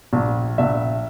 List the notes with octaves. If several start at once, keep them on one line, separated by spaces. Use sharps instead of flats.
A#1
A#1 E5